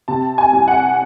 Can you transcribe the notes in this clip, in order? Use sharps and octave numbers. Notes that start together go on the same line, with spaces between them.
C3 A5
G#5
C2
F#5